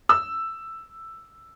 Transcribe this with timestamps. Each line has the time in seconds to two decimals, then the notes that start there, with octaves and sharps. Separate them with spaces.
0.09 E6